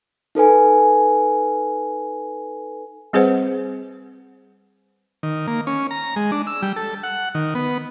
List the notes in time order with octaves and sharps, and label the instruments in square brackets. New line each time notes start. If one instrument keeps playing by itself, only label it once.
[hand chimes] D#4 A4 B4 G#5
[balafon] G3 C4 G#4 B4 C5 F#5
[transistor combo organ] D#3
A#3
C#4
A#5
G#3
D4
E6
G3
A4
F#5
D#3
B3